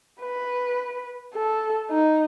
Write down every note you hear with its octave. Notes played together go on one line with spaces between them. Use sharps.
B4
A4
D#4